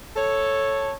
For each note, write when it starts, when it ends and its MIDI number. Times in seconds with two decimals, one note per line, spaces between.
0.16 0.93 69
0.16 0.93 73